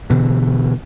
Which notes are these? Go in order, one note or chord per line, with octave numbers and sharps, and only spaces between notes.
B2 D3 E3